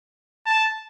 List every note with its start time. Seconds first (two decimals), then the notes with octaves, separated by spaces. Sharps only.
0.46 A5